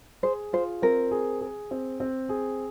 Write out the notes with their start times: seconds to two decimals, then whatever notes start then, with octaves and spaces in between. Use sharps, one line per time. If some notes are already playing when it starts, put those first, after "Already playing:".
0.23 G#4 C5
0.53 F4 C5
0.82 C4 A#4
1.11 G#4
1.41 G#4
1.71 C4
2.00 C4
2.29 G#4